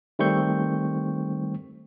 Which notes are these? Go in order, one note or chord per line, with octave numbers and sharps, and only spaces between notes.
D#3 G3 A3 C4 C#6 G6